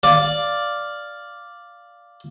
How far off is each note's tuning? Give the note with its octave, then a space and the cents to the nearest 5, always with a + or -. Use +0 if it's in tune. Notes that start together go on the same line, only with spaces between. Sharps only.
D5 +0 F5 +0